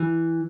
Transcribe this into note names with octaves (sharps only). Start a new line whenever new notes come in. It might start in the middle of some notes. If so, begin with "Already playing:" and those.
Already playing: E3